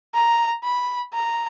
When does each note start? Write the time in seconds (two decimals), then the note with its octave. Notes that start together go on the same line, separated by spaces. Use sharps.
0.14 A#5
0.64 B5
1.14 A#5